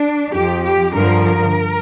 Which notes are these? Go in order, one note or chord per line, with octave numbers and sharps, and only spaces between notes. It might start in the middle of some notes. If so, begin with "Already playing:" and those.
Already playing: D4
F2 F3 G4
G4
G2 D3 F3 A#4
A#4